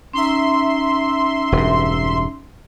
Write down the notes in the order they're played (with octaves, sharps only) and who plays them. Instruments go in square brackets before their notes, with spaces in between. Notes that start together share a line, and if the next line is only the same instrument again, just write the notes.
[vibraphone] C#4 D#4 A#5 [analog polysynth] E5 C6
[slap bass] E1 G2